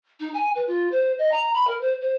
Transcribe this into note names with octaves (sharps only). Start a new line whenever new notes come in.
D#4
G#5
B4
F4
C5
D#5
A#5
B5
A#4
C5
C5